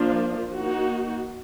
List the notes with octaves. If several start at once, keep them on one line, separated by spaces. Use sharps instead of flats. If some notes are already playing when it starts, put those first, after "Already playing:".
Already playing: F3 A#3 D4 F4
A#3 D#4 F#4